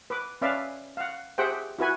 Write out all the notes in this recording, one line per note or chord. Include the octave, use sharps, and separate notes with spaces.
B4 D6
C#4 B4 D5 E5 F5
F5 F#5
G4 G#4 C5 E5 F#5 G5
E4 F#4 B4 G#5